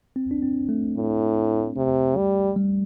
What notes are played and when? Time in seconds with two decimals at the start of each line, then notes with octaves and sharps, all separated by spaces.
0.16 C4
0.31 D4
0.42 C4
0.69 A3
0.97 A2
1.77 C3
2.16 G3
2.56 G3